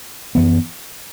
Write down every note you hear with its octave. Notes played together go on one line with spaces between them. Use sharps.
F#2 E3 B3